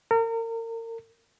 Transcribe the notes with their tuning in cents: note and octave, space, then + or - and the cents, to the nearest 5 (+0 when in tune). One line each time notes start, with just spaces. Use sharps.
A#4 -35